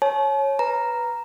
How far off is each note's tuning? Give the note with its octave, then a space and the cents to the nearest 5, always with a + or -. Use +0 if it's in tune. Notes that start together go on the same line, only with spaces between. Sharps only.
C#5 -15 A5 -45
B4 +0 A#5 +0